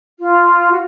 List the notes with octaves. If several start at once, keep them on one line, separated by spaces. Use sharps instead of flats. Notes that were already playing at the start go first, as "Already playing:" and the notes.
F4
F#4